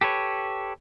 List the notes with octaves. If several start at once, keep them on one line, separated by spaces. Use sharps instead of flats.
G4 A4 B4 C#5